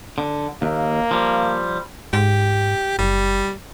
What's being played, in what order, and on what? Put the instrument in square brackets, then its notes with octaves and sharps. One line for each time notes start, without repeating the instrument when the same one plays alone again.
[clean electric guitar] D3
[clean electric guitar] D#2 [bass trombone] A#3
[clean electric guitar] F3 G3
[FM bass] G#2 [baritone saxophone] G4
[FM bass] F#1 [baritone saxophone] G3